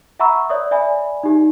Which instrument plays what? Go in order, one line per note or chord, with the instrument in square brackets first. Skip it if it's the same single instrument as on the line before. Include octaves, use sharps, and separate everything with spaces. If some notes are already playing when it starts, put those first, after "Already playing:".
[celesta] E5 F#5 A#5 B5 C#6 E6
C#5 D5 E5 D#6
D5 E5 G#5 B5
D#4 G4